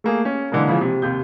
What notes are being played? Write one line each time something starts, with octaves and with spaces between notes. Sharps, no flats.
A3 A#3 G#4
C#4
D3 E3 G#3 A#3
C#3 E3 F3
C3
D#2 C3 G6